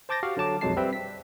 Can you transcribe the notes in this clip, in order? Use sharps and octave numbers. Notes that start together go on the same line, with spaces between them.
C5 A5 D6 G6 A6 A#6
F#4 G4 F5
D3 F#3 A5 D6
B1 F2 F#3 G#3 A5 C7
G3 C4 B4 E5 G5
B6